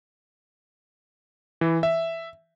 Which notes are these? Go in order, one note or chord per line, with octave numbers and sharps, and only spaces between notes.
E3
E5